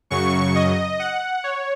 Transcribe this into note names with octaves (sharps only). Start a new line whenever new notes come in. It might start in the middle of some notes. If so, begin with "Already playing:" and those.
F#2 C#3 F#3 C#6
D#5
F#5
C#5